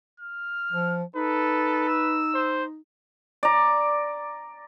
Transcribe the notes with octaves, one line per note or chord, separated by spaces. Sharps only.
F6
F3
D#4 A4 B4
E6
C5
D5 A#5